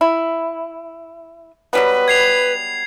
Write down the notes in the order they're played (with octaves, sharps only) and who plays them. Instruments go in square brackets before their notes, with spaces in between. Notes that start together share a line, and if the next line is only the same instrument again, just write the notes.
[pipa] E4
[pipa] F#3 G3 B3 [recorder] B4
[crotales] G#6 C7 F7